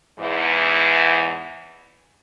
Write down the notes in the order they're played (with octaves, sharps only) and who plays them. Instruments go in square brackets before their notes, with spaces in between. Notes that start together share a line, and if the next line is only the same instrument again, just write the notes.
[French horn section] E2 G#2 E3